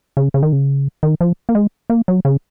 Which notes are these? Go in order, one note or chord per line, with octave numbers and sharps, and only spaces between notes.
C#3
C#3
D#3
C#3
D#3
F3
A#3
G#3
A#3
F#3
C#3